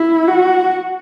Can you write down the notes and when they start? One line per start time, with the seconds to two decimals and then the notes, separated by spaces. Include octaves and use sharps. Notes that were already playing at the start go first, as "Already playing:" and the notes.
Already playing: E4
0.27 F#4